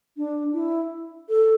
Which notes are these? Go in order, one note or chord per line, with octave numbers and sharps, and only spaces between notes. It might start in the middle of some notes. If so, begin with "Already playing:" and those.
D4
E4
A4